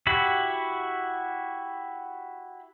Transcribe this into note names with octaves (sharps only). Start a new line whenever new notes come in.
E4 F#4 G4 B5